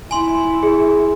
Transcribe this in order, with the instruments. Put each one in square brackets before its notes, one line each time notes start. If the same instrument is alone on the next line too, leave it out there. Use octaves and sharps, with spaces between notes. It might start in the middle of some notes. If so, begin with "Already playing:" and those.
[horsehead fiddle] E4 [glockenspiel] G#5 C6
[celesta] G#4